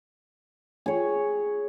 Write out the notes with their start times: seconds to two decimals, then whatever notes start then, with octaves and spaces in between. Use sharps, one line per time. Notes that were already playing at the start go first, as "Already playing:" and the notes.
0.86 G#4 C#5